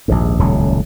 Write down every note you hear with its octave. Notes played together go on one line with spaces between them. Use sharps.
A#1 D#2 G#2
D#1 C#2 A2 F#3